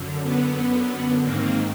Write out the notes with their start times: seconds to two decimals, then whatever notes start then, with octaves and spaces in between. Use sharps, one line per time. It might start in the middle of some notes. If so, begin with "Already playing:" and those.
Already playing: F#2 D3
0.22 B3
1.23 G#2 D#3 A#3 C4